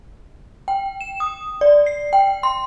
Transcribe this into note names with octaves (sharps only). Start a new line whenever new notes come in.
G5
E7
D#6
D5
C7
G5
C6